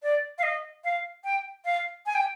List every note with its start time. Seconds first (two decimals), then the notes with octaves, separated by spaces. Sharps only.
0.03 D5
0.38 F5
0.43 D#5
0.84 F5
1.24 G5
1.65 F5
2.06 G#5
2.15 G5